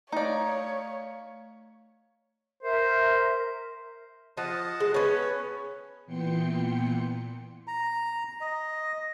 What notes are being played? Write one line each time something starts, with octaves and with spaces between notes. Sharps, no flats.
A3 D#4 C#5 D5 F5
A#4 C5 E5
F3 D#5 F#5 A5
G#3
B3 C#4 B4 C#5
A#2 E3 B3 G5 C6 C#7
A#5
D#5